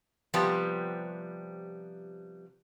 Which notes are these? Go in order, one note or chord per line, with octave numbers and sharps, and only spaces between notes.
C3 F3 G3 B3 G4